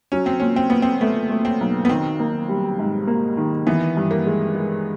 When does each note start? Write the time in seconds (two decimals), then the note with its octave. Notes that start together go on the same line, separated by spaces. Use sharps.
0.12 F#3 C#4
0.26 C4
0.40 A#2 C#4
0.56 C4
0.70 A#2 B3
0.82 C4
1.01 A3 B3
1.30 A3
1.45 C4
1.60 B1
1.85 B3
1.89 D#3 C4
2.20 A#3
2.49 G3
2.79 G#2
3.07 A#3
3.37 D#3
3.67 E3 B3
3.97 G2
4.11 A#3
4.26 G#3
4.55 G#3